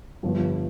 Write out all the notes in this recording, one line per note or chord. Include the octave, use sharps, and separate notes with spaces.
G1 G2 F3